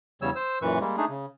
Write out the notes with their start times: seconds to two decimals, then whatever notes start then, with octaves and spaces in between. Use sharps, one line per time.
0.22 E2 C#3 G3 C#5 E6
0.36 C5 E6
0.62 F#2 A#2 E3 B4 C#6
0.80 G3 G#3 A#3
0.97 A3 D4 D#4 G#4
1.09 C#3